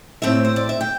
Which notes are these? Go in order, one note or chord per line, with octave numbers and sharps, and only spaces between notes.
A2 A3 C4 E5
C5
D5
E5
G5